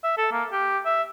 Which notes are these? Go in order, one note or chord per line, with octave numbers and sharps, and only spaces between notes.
E5
A4
A#3
G4
E5